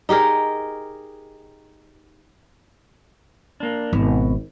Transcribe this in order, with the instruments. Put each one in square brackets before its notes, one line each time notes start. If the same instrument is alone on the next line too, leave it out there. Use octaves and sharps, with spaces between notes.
[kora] D#4 G4 G#4 A#4
[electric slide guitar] A#3 D4
[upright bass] G#1 [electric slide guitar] B2